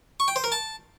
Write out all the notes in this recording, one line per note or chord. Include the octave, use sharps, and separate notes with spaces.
C#6
G5
C5
A#4
A5